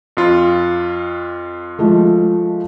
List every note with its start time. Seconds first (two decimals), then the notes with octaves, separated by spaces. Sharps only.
0.17 F2 F4
1.79 F3 G#3 A3